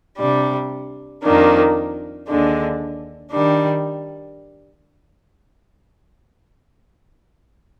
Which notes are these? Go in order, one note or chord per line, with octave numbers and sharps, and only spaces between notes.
C3 G3 D4
F2 D#3 A#3 D4
D#2 D3 G#3 D4
D#3 G3 D4